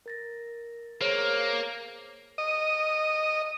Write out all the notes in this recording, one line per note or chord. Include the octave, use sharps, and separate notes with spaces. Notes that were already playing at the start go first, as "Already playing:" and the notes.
A#4 A6 A#6
A#3 G#4 C5 C#5
D#5